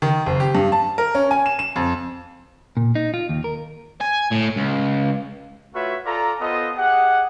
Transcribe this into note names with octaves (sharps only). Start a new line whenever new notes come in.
D#3
F#1
G4
G2
A5
A#4
C#4
G#5
E7
E7
F2
A#2
D#4
F4
D#2
A#4
G#5
A2
C#2
A3 F4 F#4 B4 C#5 E5
F4 A4 D5 A#5
B3 F4 A4 C5 D#5
G4 G#4 D#5 F#5